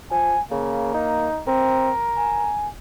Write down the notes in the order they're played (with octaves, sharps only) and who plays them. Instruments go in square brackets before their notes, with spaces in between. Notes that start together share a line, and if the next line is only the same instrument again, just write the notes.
[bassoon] F3 [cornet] G#5
[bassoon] C#3 [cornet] A#3
[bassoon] D#4
[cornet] C4 [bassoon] A#4
[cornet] G#5